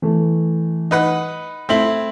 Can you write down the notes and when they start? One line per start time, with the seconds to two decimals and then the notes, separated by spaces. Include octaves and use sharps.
0.02 E3 A3
0.91 D#4 B4 F#5
1.69 A3 C4 E4 B6 F#7